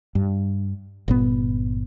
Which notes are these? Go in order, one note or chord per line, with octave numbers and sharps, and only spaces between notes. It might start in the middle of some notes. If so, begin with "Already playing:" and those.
G2
G1 A#2 B3